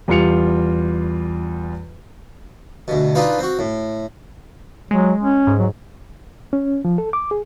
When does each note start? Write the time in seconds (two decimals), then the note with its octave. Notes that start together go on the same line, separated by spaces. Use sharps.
0.08 E2 G3 F4 C#7 F7
2.88 D2 B2
3.15 D4 D#4 F4 B4
3.39 C4 F#4
3.59 A2
4.91 F#3 G#3
5.21 C#4
5.47 G#2
5.59 F#3
6.53 C#4
6.85 F3
6.98 A4
7.13 D6
7.31 G#4